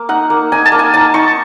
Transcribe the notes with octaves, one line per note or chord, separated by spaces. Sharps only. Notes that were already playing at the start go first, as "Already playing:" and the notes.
Already playing: A#3
D#4 F#5
A#3
D#4 G#5
A5
A#3
G#5
D#4 A5
D#4 C#6